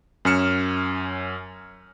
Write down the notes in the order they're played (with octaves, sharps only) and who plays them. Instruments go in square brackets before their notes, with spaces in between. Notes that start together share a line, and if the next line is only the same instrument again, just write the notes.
[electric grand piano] F#2 C#4 F6 C#7 E7